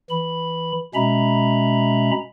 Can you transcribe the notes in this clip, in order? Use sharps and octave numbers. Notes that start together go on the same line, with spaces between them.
E3 B5
B2 G#3 C#4 E5 A#5 B5